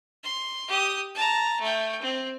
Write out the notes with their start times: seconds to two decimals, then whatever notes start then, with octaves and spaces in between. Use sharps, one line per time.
0.23 C6
0.68 G4 D#6
1.15 A5 A#5
1.61 A3 G5
2.02 C4